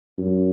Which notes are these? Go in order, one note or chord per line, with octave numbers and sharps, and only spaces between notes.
F#2